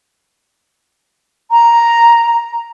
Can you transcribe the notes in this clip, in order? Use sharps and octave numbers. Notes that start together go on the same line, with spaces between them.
A#5